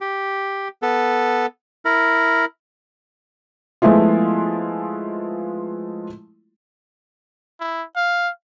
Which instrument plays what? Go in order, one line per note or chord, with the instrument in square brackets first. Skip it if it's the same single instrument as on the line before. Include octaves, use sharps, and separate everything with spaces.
[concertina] G4
B3 A4
E4 A#4
[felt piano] F3 G#3 A3 B3 E4 F4
[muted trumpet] E4
F5